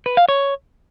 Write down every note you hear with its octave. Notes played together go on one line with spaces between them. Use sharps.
B4
F5
C#5